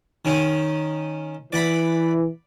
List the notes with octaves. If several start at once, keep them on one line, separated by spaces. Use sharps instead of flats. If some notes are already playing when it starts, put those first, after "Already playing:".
D#3 C#4 D#4
E3 D5 F#5 B5